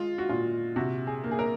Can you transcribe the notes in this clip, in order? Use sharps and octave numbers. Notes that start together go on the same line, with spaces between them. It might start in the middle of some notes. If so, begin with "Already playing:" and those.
Already playing: G#3 F4
F#4
A#2 F4
C3 F#4
G#4
A#3
G#4
A#4